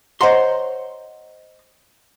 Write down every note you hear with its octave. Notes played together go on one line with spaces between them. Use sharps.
C5 C#5 D#5 F#5 A#5 C6